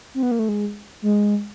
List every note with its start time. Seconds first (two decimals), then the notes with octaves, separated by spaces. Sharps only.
0.14 C4
0.23 B3
0.31 A#3
0.39 A3
0.49 G#3
1.02 G#3